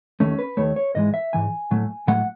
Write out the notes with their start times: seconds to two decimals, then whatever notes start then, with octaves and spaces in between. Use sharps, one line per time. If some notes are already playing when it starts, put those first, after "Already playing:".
0.20 D#2 D#3 A3 C#4
0.39 B4
0.57 D#2 D#3 A3 C#5
0.76 C#5
0.95 G#2 E3 G#3 D#5
1.14 E5
1.33 G#2 E3 G#5
1.71 A2 F#3 A3
2.07 A2 F#3 A3 F#5